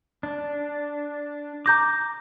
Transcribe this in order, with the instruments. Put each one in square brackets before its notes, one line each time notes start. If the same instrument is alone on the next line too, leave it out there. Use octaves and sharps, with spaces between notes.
[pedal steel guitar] D4
[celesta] A#5 G6 A#6 [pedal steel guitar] D6